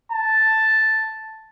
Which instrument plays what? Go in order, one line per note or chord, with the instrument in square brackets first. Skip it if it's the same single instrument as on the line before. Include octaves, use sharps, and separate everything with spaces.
[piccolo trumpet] A5